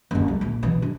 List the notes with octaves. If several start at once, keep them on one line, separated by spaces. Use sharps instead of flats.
F#1 C3
C#2
A#1
B2 E3
D4